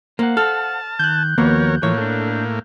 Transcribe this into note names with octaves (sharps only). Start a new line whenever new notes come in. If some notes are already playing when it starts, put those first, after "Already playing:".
A#3 C5 F5 F#5
A4 A5 F6
D#3 F#6 G6
D#2 F3 A#3 B3 F#4 A#4 C#5
A2 E3 F3 A#3 C#5
D4 A4